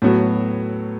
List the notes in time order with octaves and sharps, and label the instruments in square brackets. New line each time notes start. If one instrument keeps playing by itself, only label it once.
[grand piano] A2 F#3 B3 F#4